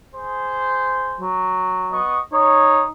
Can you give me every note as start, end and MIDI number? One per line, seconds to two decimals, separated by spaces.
0.15 1.25 68
0.15 1.25 72
1.20 1.99 54
1.91 2.19 59
1.91 2.19 75
1.91 2.19 85
2.33 2.90 63
2.33 2.83 73